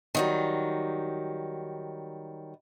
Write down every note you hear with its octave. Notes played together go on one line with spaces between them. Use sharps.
D#3 F#3 G3